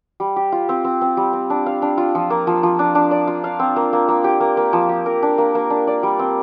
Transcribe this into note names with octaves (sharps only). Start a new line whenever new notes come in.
G3
G4
F4
C4
C4
C4
G3
C4
D4
F5
D4
F4
F3
A#3
F3
F3
D4
D4
D5
F4
F5
C4
A#3
A#3
A#3
G4
A#3
A#3
F3
G4
A#4
D4
A#3
A#3
D4
D5
G3
C4